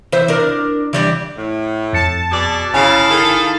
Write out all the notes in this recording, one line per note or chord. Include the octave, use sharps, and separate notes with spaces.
E3 C5 E5
D4 A#4
E3 G3 D4
A2
F2 A5 C#7
B2 G#4 D5
G1 C#3 E4 F5 G#5
D#3 G#4 A4